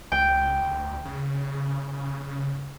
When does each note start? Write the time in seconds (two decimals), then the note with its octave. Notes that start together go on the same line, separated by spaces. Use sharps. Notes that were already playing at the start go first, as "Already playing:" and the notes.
0.12 C#2 G5
0.61 D2
1.05 C#3